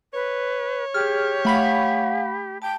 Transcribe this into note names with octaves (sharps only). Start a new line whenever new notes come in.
B4 C#5
G4 G#4 F6
A3 F5 F#5 B5 B6
G5 A5